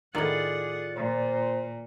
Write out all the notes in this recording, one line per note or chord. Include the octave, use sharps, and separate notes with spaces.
A2 D#3 F4 G#4 D5 F#5
A#2 C5